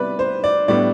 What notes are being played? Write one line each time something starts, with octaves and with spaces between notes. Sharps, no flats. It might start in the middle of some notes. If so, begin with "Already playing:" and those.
Already playing: C3 G3 B3 E4 B4 D5
C5
D5
A2 G3 B3 D4 D5